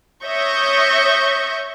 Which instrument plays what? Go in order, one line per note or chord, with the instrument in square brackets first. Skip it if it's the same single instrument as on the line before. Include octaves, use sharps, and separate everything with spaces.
[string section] C#5 E5 C#6 D#6 G6 A#6